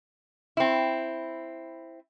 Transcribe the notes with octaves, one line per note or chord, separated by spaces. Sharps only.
C4 E4